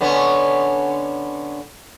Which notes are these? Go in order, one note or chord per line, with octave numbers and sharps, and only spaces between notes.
D3 B3 C#4